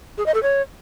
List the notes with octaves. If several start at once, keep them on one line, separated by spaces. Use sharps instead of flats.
G#4
D#5
A4
C#5